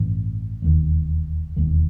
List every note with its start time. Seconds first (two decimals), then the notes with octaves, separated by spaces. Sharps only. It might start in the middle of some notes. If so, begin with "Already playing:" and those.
Already playing: A1 G2 E3
0.62 E1 D#2 D#3
1.56 E1 D#2 D#3